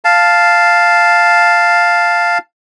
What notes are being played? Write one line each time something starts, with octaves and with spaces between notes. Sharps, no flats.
F5 A5